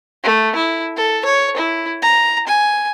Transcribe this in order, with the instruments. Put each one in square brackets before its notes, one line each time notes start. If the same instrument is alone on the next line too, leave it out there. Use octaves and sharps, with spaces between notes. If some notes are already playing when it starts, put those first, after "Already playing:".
[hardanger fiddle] A3
E4
A4
C#5
E4
A#5
G#5